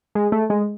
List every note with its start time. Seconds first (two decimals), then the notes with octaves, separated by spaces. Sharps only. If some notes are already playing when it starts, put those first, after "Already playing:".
0.15 G#3
0.32 A3
0.50 G#3